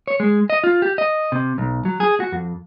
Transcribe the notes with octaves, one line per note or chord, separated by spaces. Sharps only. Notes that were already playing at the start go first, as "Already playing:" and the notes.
C#5
G#3
D#5
F4
G4
D#5
C3
B1
F#3
G#4
F#4
F2